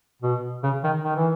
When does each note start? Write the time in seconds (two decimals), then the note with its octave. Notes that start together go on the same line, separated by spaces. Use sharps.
0.22 B2
0.63 C#3
0.84 D#3
1.04 D#3
1.16 E3